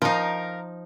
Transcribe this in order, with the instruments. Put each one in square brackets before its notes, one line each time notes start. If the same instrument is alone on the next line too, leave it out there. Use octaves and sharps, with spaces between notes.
[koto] F3 D#4 [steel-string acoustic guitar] A#4 F5